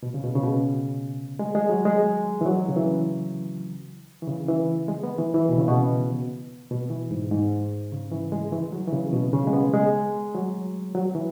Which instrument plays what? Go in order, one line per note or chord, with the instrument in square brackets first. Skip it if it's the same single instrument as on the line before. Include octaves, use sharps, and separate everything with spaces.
[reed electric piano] B2
C#3
B2
C#3
B2
G#3
G#3
F#3
G#3
E3
F#3
C#3
E3
E3
C#3
E3
G#3
B3
E3
E3
B2
C#3
B2
B2
E3
G#2
G#2
C#3
E3
G#3
E3
F#3
E3
C#3
B2
C#3
G#3
B3
G#3
F#3
F#3
E3